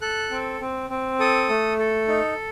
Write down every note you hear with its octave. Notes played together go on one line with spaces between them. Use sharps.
A4 F#6
C4
C4
C4
A4 D#6
A3
A4
D#4